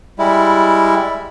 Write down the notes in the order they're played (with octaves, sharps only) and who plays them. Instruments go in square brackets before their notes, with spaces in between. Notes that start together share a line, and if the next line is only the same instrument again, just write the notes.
[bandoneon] G3 G#3 E4